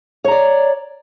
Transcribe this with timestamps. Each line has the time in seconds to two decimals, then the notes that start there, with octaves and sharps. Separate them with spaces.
0.24 C#5
0.28 A#5
0.31 D5